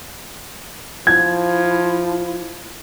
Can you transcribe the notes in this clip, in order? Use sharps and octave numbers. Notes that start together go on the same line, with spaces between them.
F3 E4 G#6